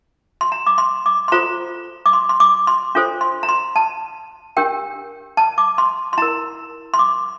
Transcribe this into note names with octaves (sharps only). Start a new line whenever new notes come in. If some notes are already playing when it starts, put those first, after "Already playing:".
C6
A#5
D6
C6
D6
C6
F4 A4 C5 A#5
D6
C6
C6
D6
C6
D4 F4 A4 C5
C6
A#5
C6
A5
D4 G4 A#4 G5
A5
D6
C6
C6
E4 A#4 A#5
C6
D6